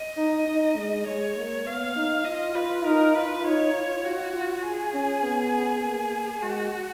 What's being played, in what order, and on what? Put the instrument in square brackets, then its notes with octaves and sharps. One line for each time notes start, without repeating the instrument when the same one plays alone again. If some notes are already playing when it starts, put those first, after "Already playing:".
Already playing: [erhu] D#5
[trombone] D#4
D#4
G#3
[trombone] G#3 [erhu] C#5
[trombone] A#3
[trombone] B3 [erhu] F5
[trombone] D#4
[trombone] F4 [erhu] D#5
[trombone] F4 [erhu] B4
[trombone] D#4 [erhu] A#4
[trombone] F4 [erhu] B4
[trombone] D#4 [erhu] C#5
[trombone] F4
[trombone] F4 [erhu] F#4
[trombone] F4
[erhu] G#4
[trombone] C#4
B3
A#3
[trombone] G#3 [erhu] F#4